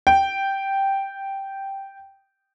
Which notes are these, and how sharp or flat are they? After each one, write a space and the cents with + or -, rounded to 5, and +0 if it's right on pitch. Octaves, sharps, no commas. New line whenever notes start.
G5 -5